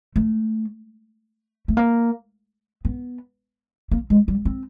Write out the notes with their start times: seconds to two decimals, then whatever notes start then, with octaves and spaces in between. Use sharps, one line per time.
0.16 A3
1.68 A3
1.77 A#3
2.85 B3
3.91 A#3
4.10 G#3
4.28 G3
4.45 C4